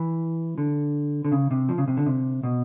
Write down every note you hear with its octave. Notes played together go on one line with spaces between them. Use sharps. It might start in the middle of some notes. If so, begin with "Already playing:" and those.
Already playing: E3
D3
D3
C#3
C3
F3
C#3
C3
D3
C3
B2